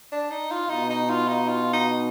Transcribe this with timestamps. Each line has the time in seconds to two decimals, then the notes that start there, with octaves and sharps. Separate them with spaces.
0.12 D4
0.30 D#4
0.51 F4
0.70 B2 D#4
0.90 D#4
1.09 F4
1.28 D#4
1.48 F4
1.73 D#4